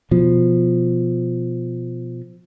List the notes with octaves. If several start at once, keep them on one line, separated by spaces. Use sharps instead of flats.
B2 F3